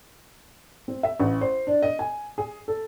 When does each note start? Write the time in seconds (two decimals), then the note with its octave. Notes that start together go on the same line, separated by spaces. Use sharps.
0.88 C4
1.03 E5
1.20 A1
1.41 C5
1.67 D4
1.82 D#5
1.99 G#5
2.38 G#4
2.68 A4